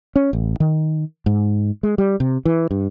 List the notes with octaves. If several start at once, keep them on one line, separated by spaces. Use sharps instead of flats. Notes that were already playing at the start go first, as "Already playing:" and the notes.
C#4
A1
D#3
G#2
G#3
G3
C3
E3
G2